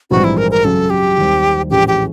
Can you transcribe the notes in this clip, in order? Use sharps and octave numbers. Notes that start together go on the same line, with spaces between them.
A#1 G#2 E3 G3 C4 F#4
E4
A#4
A#4
F#2 C#3 F#3 A4
G4
D#2 D#3 G3 C4
A#1 A2 E3 G#3 C#4 G4
G4